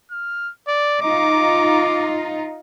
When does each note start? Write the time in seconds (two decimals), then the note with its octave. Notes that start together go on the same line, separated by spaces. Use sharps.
0.11 F6
0.68 D5
1.02 D#4 F4 D6